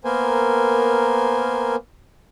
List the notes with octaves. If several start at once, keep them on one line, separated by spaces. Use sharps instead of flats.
A#3 B3 A#4 C5 G#5